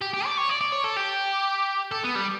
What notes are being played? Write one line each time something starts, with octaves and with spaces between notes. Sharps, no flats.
G4
G4
D5
C#5
D5
D5
C#5
A4
G4
A4
B3
G3